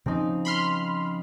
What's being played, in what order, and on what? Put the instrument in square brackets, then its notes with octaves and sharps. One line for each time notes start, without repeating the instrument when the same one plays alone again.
[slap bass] C#3 F3 C#4 [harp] C4 D#4
[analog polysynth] B5 C6 F6